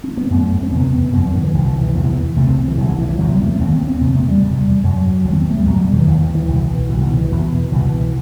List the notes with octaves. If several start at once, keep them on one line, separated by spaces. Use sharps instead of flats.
C4
B3
F#2 A3
C4
E2 C3 B3
F#2 C4
E3
D#3
E3
C2 B2 D#3
E3
E3
E2 C3 E3
E3
C2 C3 A3
C4
E3
C2 C3 D#3
E3
E3
E3
E2 C3 F#3
G3
A3
B3
D#2 C4
B3
C4
E2 C3 B3
A3
G3
E2 C3
F#2 F#3
D#2 G3
C4
B3
A3
G3
E2 B2 F#3
G3
G3
D#3
E3
D#2 E3
E3
E3
C2 B2
C2 B2
D#3
E3
E2 B2
C2 B2 E3